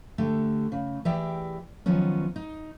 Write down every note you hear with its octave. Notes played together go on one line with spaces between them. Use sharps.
D3 A3 G4
C#3
E3 G4 G#4 D5 E5 G5
D#3 F3 F#3 B3 C#4
D#4